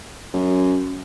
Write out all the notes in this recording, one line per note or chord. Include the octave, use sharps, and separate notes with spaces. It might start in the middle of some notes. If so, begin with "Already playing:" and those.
F#2